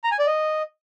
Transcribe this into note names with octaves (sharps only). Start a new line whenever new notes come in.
A#5
G#5
D5
D#5